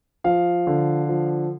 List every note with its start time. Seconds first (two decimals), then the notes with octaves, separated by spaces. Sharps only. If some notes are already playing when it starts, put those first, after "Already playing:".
0.24 F3 F5
0.67 D3
1.09 F3